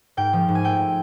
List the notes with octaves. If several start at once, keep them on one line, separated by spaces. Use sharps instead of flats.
G#2 G5
F3
G#2
G#5
A3 G5